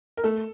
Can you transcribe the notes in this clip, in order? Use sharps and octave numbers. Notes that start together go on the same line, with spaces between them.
A#4
A3 A4